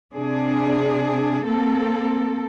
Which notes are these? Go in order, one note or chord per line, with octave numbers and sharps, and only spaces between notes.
C3 D4 G#4
A#3 C4 A4